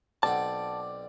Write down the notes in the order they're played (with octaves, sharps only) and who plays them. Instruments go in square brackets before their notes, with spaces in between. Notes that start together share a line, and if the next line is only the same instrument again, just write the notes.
[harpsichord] B1 C4 F#5 [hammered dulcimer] D5 [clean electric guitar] A5